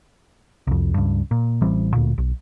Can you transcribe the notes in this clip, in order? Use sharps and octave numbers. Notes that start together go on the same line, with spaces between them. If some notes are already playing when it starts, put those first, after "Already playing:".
C2 F2
C#2 G2
A#2
A1 E3 G3 C4
D1 D2 A#2
B1